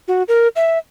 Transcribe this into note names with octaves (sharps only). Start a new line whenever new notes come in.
F#4
A#4
E5